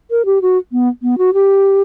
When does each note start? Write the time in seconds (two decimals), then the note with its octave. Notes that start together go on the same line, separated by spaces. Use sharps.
0.11 A#4
0.25 G4
0.42 F#4
0.72 B3
1.02 B3
1.18 F#4
1.34 G4